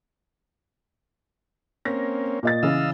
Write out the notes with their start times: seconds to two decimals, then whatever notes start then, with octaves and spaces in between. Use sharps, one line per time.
1.85 A#3 C4 C#4 A#6
2.43 A#2 D#5 A6
2.63 C#3 E3 D#5 F5 E6